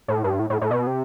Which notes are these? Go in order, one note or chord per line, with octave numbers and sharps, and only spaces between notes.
A2
G2
A2
A2
A2
B2
C3